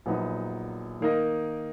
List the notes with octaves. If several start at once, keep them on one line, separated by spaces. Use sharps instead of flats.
A#1 A#2 F#3 B3 D#4
D#3 A#3 D#4 A#4 D#5